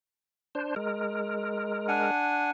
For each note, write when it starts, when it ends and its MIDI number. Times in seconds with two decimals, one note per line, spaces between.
0.55 0.75 62
0.55 0.75 72
0.76 2.11 56
0.76 2.11 70
1.88 2.51 62
1.88 2.51 78
1.88 2.51 80